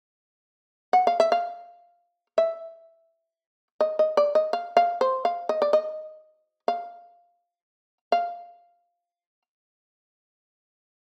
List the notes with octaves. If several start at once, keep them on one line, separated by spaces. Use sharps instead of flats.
F#5
F5
E5
F5
E5
D#5
D#5
D5
D#5
F5
F5
C5
F5
D#5
D5
D#5
F5
F5